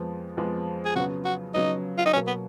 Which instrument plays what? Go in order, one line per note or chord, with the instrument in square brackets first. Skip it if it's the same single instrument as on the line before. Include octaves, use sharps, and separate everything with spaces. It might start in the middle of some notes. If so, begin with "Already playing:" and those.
Already playing: [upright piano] F2 F3 G#3 B3
F2 F3 G#3 B3
[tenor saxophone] G#4
[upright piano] C#3 F#3 B3 [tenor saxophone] F#4
[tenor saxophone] F#4
[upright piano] C#3 F#3 B3 [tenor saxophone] D#4
[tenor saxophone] F4
D#4
[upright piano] B2 F#3 A#3 [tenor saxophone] C#4
[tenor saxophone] B3